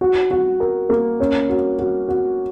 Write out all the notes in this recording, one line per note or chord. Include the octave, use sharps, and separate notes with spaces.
F#4
F#4
A#4
A#3
C#4
F#4
F#4
F#4